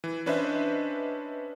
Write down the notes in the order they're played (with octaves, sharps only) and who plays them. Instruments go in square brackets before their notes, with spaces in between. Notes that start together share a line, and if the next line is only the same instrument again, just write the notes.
[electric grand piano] E3
C#4 D4 B4 C5 D#5 E5